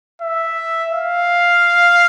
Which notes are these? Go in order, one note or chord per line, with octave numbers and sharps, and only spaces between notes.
E5
F5